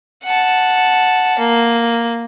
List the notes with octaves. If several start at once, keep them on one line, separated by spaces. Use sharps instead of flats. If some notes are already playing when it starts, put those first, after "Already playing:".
F#5 A5
A#3